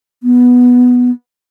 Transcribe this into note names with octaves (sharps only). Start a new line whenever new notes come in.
B3